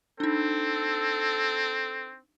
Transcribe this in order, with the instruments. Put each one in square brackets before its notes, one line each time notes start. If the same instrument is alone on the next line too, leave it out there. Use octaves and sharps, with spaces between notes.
[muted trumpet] C4 [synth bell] D4 D#4 [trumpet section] A4